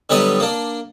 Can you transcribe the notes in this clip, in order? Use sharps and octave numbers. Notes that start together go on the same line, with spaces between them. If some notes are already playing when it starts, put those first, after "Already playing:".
D3 F#3 G3 B3 D#5
A#3 D4